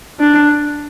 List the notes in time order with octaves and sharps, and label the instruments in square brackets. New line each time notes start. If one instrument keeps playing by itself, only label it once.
[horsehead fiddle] D4